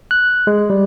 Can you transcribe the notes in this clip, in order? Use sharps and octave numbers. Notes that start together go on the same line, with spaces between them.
F#6
G#3
G3